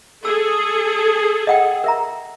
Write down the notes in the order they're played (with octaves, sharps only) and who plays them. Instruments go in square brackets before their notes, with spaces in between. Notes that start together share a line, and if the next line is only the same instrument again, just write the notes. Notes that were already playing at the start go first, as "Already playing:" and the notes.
[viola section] G#4 A4 [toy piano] E6
[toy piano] D#5 F#5 G5
A#4 E5 A#5